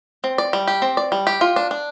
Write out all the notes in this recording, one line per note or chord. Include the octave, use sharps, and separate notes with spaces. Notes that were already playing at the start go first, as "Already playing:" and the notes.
C4
D5
G3
G4
C4
D5
G3
G4
F4
D4
D4